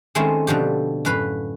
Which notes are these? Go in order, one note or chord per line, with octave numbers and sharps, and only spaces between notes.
D#3 G#3 A3 C4 C#4 E4
B2 D3 F3 G4
F#2 A2 B4 F5 B5